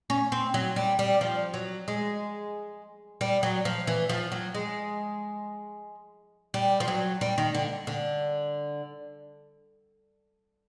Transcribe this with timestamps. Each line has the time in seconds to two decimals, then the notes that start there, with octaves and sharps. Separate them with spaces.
0.10 C#4
0.32 C4
0.54 F#3
0.76 G3
0.99 G3
1.21 F3
1.54 F#3
1.88 G#3
3.21 G3
3.43 F#3
3.65 F3
3.87 E3
4.09 F3
4.32 F#3
4.54 G#3
6.54 G3
6.80 F3
6.88 F#3
7.21 G3
7.38 D#3
7.55 D3
7.87 D3